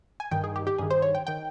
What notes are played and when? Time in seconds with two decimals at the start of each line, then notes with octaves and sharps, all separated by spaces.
0.20 G#5
0.31 G2 D#3 G5
0.44 G#4
0.56 G4
0.67 G4
0.78 G2 D#3 G#4
0.91 C5
1.02 C#5
1.15 G5
1.27 D#3 G5